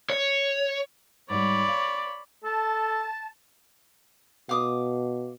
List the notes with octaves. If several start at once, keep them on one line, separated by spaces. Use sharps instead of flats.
C#5
G#2 G3 C#5 D5 B5
F5
A4 A5
B2 F5 D6 D#6